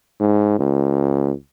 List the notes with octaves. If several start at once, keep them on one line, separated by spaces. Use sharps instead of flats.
G#2
C#2